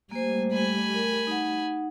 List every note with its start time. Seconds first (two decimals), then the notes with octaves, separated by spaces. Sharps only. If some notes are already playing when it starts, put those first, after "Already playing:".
0.11 G3 A3 A#3 C5 G#5
0.52 G#5 B5
0.94 A#4
1.27 D#4 F#5